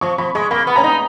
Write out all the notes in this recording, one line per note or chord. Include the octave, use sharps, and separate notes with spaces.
F3 C#6
F3 B5
G#3 C#6
A#3 B5
B3
C#4 A#5
D#4